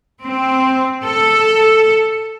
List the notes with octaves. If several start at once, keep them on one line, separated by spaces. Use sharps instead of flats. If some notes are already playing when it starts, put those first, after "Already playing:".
C4
A4